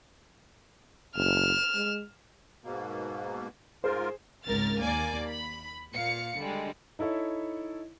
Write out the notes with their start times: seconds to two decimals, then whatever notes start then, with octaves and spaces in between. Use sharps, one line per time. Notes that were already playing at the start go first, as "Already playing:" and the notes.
1.15 F#1 F6 E7
1.75 G#3
2.64 G#2 B2 A#3
3.84 G#2 F4 G#4 A#4 C5
4.45 G#1 C#2 A#4 F6 A6
4.82 D#2 A#3 D5 G#5 D6
5.27 B5
5.93 A#2 F5 C#7
6.38 D3 G3 G#3
6.99 D#4 E4 A4 C#5 E5